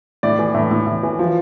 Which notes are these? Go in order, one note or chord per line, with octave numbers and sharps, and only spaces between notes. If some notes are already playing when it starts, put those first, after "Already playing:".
A2 D5
E3
A2
A2
A2
E3
F3